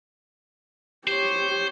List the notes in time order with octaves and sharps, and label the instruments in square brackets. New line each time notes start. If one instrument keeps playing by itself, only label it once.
[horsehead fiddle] G4 C#5 [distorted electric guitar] C5